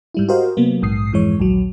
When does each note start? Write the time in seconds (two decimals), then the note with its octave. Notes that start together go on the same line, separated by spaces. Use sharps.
0.14 G#2 G3 E4
0.29 F#4 G4 A#4 C5 D#5 F5
0.57 C3 F#3 A#3 B3
0.82 A#1 G#2 D#6 C7
1.12 F2 G#2 E3 G#3 C#5
1.40 A#1 D#2 F#3